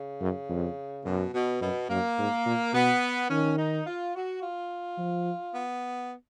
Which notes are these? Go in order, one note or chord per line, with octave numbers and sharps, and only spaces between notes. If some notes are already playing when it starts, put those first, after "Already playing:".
Already playing: C#3
F#2
F2
F#2 B2
B2
F#2 B2
F#2 A#3
G#2
A#2
B2 B3
D#3 C#4
D#4
F4
F#4
F4
F3
B3